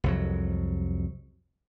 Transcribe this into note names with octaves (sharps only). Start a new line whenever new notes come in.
C2 F2 F#3